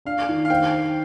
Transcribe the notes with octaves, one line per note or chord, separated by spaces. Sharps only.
D4 F5
D#3
F5
C5 G5